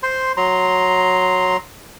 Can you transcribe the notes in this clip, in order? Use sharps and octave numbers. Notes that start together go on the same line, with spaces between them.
C5 C6
F#3 A#5 C6